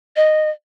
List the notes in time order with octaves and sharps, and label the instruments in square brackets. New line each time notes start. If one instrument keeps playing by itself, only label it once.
[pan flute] D#5